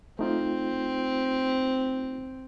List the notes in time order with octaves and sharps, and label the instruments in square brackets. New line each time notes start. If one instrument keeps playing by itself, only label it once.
[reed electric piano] A3 D#4 F4 [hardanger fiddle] C4